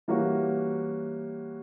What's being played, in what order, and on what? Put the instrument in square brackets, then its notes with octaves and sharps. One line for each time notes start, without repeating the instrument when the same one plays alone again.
[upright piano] E3 G3 A#3 C#4 F#4